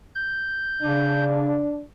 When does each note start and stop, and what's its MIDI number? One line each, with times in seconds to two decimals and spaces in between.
0.15 1.24 91
0.82 1.66 49
0.82 1.82 62